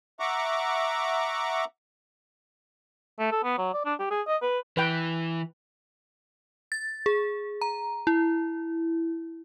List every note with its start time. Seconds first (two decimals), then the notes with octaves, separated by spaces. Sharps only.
0.20 E5 F#5 A#5 C#6 D6
3.19 A3
3.31 A4
3.44 B3
3.58 F#3
3.74 D5
3.85 D4
3.99 G4
4.11 G#4
4.27 D#5
4.42 B4
4.77 E3 B4 G5
6.72 A6
7.06 G#4
7.61 A#5
8.07 E4